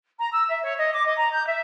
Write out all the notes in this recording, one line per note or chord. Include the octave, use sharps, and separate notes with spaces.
A#5
E6
E5
C#5
D#5
D6
D#5
A#5
G6
E5